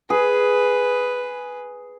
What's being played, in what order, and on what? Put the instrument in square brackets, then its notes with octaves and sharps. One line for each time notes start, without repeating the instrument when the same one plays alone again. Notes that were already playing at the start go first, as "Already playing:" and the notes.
[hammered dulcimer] G#4 [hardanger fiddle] B4